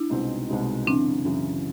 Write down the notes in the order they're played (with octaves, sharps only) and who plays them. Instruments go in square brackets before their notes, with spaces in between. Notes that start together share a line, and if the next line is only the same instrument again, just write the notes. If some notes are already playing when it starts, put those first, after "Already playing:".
Already playing: [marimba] D4 E4
[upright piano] C2 B2 G#3 C4 D#4
C2 B2 G#3 C4 D#4
[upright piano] F#2 C#3 E3 [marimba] C4 D4
[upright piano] F#2 C#3 E3